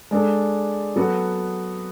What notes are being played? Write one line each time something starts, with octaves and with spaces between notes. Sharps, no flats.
G#3 D4 A4
F#3 B3 F#4 A4